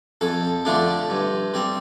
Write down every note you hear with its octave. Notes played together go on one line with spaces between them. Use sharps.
F2 A4
D3 F3 A3 D4
G2
G3 C4